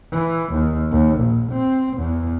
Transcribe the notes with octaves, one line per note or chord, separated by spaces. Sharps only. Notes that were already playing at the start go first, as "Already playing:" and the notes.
E3
D#2
D#2
A#1
C4
E2